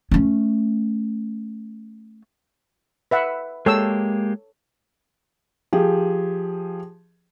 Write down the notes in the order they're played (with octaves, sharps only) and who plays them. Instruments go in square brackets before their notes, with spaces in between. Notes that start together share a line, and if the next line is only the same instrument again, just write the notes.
[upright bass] A3 C#4
[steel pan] B4 E5 F#5
[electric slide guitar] G#3 A#3 G4 [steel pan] A4 C#5 E6
[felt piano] F3 G4 G#4